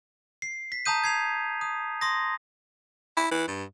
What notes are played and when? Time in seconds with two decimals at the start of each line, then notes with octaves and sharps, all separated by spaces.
0.42 C7
0.72 B6
0.86 A5 A#5 D#6 G6 D#7
1.04 G#6 C7 F7
1.61 D#6
2.01 C6 D#6 A#6
3.17 E4
3.31 E3
3.48 G2